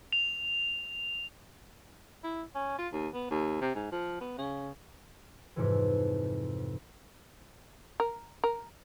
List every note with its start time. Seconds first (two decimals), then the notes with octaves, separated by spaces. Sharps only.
0.13 F7
2.23 E4
2.55 C#4
2.78 F4
2.93 D#2
3.14 B3
3.30 D#2
3.61 C3
3.75 G#2
3.92 F3
4.21 B3
4.38 C#3
5.56 F2 G#2 C3 E3
8.00 A#4
8.44 A#4